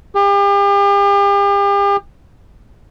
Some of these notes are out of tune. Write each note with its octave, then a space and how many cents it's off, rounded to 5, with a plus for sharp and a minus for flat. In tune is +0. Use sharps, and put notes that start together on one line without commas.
G4 +40